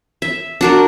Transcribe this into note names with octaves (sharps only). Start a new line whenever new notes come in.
E5
D4 F#4 A#4